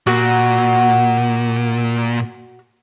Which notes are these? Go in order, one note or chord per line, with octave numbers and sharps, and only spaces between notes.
A#2 F#4